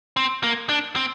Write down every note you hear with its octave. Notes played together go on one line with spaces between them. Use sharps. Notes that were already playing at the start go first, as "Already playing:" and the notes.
C4
A#3
D4
C4